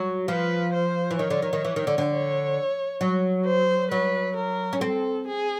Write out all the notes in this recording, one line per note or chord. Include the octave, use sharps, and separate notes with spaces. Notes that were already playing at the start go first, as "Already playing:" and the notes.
Already playing: F#3
F3 B4
C5
E3
D#3 C#5
D3
D#3
D#3
E3
D#3
D3
D3
C#5
F#3
C5
F#3 B4
A#4
C#4
C4 A4
G#4